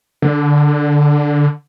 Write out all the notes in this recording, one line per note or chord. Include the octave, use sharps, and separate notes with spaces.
D3